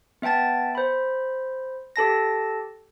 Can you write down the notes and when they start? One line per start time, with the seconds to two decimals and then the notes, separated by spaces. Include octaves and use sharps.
0.22 B3 E5 G5 A5 A6
0.75 C5 B5
1.96 G4 A4 A5 A#6